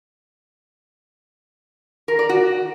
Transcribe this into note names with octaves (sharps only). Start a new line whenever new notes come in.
A#4
D5
F#4